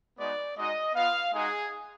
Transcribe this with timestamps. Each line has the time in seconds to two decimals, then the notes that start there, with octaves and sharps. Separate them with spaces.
0.18 G#3 B3 D#4 F#4 D5
0.56 G#3 D#4 F#4 D#5
0.95 B3 F4 F5
1.33 G#3 D#4 F#4 G#4